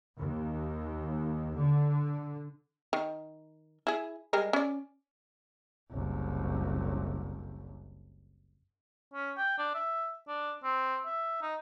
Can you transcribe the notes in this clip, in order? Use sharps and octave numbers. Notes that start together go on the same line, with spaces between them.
D#2
D3
D#3
E4 G#4
G3 G#3 A#4
C#4 D5
F#1 C2
C#4
G5
D4
E5
D4
C4
E5
D#4